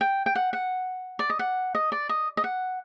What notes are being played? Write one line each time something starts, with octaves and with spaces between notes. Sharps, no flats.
G5
G5
F#5
F#5
D5
D#5
F#5
D#5
D5
D#5
D#5
F#5